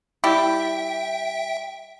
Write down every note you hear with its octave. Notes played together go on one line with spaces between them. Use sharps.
G3 E4 G4 E5 G5